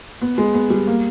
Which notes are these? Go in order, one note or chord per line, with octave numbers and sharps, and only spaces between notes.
B3
G#3
B3
G3
A#3